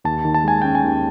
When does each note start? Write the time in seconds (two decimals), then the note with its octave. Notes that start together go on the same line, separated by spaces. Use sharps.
0.04 D#2 A5
0.25 D#3
0.34 A5
0.44 G#3 G#5
0.62 C#4 G5
0.75 G#5
0.84 D#2